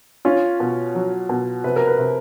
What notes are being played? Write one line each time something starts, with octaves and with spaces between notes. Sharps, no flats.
C#4 F4
B2
F#3
B2
C3 B4
A#4
B4
C3